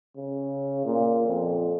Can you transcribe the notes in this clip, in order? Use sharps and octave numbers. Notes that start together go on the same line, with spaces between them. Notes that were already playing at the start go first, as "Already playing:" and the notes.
C#3
A#2
F2